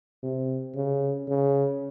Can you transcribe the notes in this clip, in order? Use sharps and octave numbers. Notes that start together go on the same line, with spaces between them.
C3
C#3
C#3